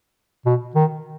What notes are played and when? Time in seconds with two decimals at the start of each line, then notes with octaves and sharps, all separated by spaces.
0.46 B2
0.75 D#3